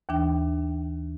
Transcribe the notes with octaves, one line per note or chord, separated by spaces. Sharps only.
D#2 E3 D4 G5